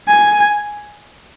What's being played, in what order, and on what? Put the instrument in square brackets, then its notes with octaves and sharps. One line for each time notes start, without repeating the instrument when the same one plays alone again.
[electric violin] G#5